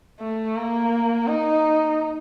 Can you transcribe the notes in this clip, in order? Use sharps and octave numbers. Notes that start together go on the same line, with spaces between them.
A3
A#3
D#4